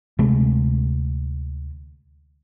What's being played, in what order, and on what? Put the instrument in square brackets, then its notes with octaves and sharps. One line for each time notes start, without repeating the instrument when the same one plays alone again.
[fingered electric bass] D2 C3 G#3 A3